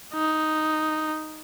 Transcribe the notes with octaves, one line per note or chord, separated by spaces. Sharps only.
D#4